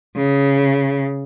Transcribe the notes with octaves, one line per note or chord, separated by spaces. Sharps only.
C#3